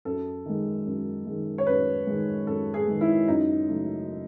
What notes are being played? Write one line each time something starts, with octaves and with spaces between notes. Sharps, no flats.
F#2 A4
D#3 G#3
F#2
D#3 G#3
C#5
F#2 B4
D#3 G#3
F#2 A4
G#4
D#3 G#3
E4
F#2 D#4
C#3 F#3 A3